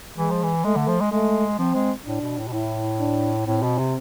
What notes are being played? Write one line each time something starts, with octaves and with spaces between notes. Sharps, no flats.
E3 G#3
F3
E3
G#3 A3
D3
F3
G#3
G#3 A3
F3 C4
G#3
A2 D4
B2
A2
B2
A2 E4
D4
A2 C4
B2
C3